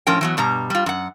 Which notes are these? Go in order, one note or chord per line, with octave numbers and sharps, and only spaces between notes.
A2 F3 C#4 A#4 G5
E3 F#3 B3
G2 B2 G3 A#5
G3 F4
F#2 F#5